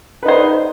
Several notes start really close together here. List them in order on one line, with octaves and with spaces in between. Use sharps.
B4 D#4 C5